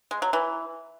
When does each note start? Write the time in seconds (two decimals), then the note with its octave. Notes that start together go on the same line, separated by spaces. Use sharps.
0.11 G#3
0.22 F#3
0.33 E3